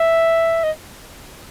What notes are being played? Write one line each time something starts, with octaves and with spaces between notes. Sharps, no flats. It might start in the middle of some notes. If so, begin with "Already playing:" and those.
Already playing: E5
D#5